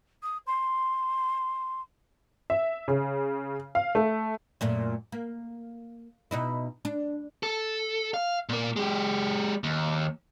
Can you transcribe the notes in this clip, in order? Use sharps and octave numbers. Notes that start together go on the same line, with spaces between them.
D#6
C6
E5
C#3
F5
A3
F#2 A#2 A3
A#3
B2 D#4 E4
D4
A4
F5
A#2 A#3
G#3 G4
D#2